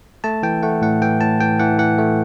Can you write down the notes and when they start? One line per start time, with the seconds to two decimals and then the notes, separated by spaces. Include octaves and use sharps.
0.24 A3 A5
0.43 E3 G5
0.63 A3 F#5
0.82 A2 F#5
1.02 E3 G5
1.21 A2 A5
1.40 E3 G5
1.60 E3 F#5
1.78 E3 F#5
1.98 A3